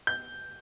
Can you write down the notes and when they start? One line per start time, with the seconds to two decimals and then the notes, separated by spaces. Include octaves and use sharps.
0.07 G6